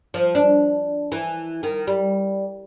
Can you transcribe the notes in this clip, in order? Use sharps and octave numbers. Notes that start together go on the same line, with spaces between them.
F3
D4
E3
D#3
G3